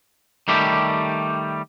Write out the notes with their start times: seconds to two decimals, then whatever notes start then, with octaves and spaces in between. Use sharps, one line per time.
0.48 D#3 G3 A3 G4